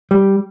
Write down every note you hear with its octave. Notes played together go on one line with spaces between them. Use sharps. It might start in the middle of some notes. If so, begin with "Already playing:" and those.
G3